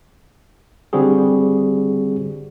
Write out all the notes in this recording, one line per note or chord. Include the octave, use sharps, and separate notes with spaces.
D3 G3 C4 F#4 G#4